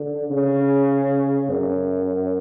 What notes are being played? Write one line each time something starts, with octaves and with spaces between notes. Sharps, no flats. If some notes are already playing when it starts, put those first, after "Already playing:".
Already playing: D3
C#3
F#2